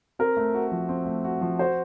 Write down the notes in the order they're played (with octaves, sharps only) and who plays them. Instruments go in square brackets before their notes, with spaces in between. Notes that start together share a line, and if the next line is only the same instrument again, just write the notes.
[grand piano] C4 [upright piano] A#4
[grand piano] A3
F#4
F3
C4
A3
F#4
F3
[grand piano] F#4 [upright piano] C5